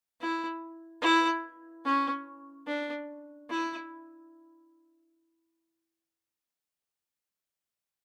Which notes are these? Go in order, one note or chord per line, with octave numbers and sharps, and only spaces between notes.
E4
E4
C#4
D4
E4